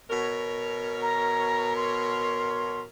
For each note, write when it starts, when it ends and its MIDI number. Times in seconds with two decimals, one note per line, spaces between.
0.11 2.84 47
0.11 2.84 70
0.11 2.84 73
1.02 1.74 82
1.76 2.80 84